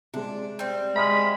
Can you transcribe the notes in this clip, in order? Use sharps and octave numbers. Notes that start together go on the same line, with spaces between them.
C3 G#3 D4
G3 C4
G#3 E5 B5 F6